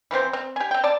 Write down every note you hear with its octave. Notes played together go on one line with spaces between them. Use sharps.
E3 F3 C4 C5
C4
G4 G#5
C4 G5
D5 A5